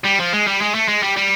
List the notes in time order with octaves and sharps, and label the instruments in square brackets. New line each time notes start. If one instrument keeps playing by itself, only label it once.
[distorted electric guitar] G3
F3
G#3
G3
G#3
A3
G#3
G3
G3